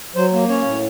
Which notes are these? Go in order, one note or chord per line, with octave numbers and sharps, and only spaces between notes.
F#3 C5
A#3
C#4 C#5
A2